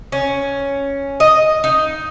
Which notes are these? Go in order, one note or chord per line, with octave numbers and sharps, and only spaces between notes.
C#4
D#5
D#4